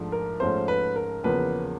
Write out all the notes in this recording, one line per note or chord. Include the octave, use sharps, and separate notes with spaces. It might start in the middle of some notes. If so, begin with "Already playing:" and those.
Already playing: G#2 F3 A3 D4
A#4
G#2 F3 A3 C#4 C5
B4
A#4
E2 C#3 F3 A#3 B4